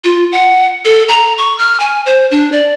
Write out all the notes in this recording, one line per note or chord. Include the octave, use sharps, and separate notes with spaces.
F4
F#5
A4
A#5
C#6
F6
G#5
C5
D4
D5